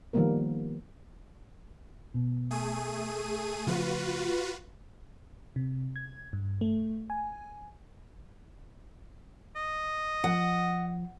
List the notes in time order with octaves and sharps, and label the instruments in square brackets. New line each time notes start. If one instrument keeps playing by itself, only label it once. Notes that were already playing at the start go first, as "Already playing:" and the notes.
[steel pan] D#3 F3 G3 A#3 B3 A#4
[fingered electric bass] B2
[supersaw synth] A3 G#4 D#7
[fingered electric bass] C#3 F3 A3 [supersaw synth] F4 F#4 B4
[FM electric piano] C3
G#6
G2
A3
G#5
[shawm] D#5
[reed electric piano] F3 [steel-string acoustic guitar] F#5